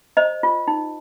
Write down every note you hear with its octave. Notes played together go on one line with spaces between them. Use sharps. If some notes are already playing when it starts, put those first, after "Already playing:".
C5 D#5
F4
D#4